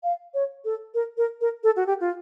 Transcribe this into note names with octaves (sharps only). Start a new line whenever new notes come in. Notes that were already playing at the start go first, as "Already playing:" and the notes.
F5
C#5
A4
A#4
A#4
A#4
A4
F#4
G4
F4